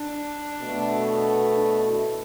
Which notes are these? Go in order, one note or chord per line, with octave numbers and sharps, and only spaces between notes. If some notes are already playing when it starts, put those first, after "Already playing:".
Already playing: D4
B2 A3
D4
E4